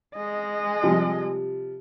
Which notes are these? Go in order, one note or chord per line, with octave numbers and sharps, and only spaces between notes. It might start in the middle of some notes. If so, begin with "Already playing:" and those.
G#3 D#5
C3 F3 G3